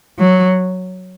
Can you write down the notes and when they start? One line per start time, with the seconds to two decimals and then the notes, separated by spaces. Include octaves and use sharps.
0.19 F#3